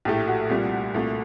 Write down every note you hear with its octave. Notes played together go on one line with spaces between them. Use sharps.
A#1 A2 A3 G4
F#4
C2 A#2 G3
C2 A#2 A3